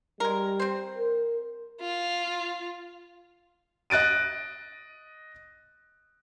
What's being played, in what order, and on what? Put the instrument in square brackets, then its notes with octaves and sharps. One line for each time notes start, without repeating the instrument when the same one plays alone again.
[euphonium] G3 [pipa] G#3 A#4
[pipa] C4 C5
[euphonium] A#4
[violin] F4
[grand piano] D#5 F#6 A6 D7 D#7